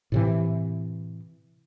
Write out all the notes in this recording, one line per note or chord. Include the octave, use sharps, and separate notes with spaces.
A2 C3 E3